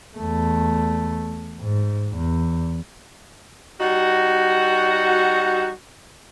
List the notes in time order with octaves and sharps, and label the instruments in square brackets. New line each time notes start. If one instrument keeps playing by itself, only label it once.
[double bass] E2 A3
G#2
E2
[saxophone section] G3 D#4 F#4